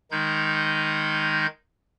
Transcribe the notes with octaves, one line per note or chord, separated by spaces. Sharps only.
D#3 G#3 D#4 G6 G#6